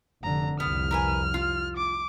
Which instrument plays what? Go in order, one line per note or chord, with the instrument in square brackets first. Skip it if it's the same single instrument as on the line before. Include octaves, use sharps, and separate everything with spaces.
[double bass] F1 D3 [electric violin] A#5
[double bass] C2 F2 [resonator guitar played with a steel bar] B3 [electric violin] F6
[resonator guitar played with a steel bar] A#4 B4 G#5
F4
[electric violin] D6